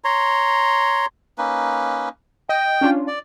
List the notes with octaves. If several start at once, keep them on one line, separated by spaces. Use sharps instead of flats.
C#5 A#5 C6
A#3 C#4 D#4 B4
D#5 G5
C#4 D4 F4
D5